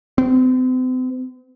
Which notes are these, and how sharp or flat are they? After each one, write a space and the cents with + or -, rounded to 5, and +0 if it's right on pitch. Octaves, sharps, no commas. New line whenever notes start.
C4 -40